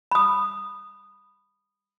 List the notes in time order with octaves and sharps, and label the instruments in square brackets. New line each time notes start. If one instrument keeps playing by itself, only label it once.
[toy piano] B5 D#6